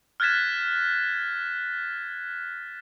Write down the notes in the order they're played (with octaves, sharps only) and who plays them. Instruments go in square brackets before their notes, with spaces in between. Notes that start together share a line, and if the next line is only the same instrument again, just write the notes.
[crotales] F6 F#6 G#6 A6 B6 E7